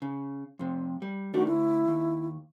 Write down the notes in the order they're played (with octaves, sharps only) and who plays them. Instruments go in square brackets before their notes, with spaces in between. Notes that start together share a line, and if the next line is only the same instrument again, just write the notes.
[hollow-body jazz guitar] C#3
F2 C3
G3
[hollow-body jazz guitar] D#3 A3 D4 [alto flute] F#4
[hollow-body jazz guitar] D2 [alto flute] E4
[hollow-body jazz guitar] D#2